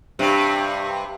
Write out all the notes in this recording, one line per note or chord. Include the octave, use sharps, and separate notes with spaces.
G2 C3